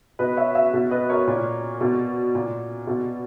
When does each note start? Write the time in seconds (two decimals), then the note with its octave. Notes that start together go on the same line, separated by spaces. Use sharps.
0.19 B2 B4 D#5
0.37 C#5 E5
0.55 C#5 E5
0.73 B2
0.91 B4 D#5
1.10 A#4 C#5
1.27 A#2
1.81 B2
2.35 A#2
2.87 B2